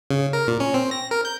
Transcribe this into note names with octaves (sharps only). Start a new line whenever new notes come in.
C#3
A#4
A#2
C#4
C4
A#6
A#4
G6